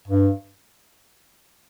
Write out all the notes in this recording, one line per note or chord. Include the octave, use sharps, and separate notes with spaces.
G2